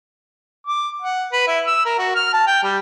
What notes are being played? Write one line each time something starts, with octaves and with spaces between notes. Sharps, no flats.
D6
F#5
B4
E4
E6
A#4
F#4
F6
A5
G5
G3